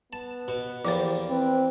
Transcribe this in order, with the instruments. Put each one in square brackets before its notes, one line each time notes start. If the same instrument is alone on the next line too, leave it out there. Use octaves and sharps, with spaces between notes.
[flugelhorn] B3 [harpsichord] A5
[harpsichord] B2
[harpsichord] E2 A#3 [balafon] F3 C5 [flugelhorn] G4
[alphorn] C4 [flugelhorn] B4